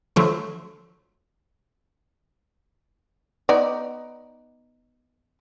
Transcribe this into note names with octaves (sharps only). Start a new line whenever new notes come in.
D3 F3 F#3 A3
B3 D#4 D5